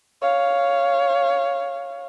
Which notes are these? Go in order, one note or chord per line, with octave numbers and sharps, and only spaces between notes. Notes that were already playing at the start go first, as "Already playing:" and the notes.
C#5 F5